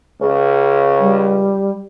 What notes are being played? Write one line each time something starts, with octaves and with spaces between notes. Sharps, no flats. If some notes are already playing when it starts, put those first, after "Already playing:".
C#2 C#3
G3